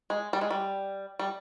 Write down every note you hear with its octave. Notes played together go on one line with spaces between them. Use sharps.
G#3
G3
G#3
G3
G3